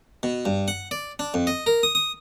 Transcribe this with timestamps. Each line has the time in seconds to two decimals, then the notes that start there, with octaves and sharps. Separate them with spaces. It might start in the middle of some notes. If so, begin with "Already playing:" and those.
0.23 B2
0.45 G2
0.68 F#5
0.91 D5
1.19 D4
1.34 F2
1.47 D#5
1.66 A#4
1.83 D#6
1.95 D#6